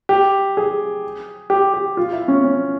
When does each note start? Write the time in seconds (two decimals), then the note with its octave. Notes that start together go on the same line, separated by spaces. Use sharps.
0.09 G4
0.57 G#4
1.50 G4
1.74 G4
1.97 F4
2.13 E4
2.28 C#4
2.44 C#4